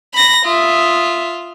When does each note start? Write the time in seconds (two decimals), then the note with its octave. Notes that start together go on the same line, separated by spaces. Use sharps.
0.14 B5 A#6
0.45 F4 E5 D#6